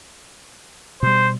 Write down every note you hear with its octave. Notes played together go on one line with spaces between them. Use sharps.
B2 G3 C5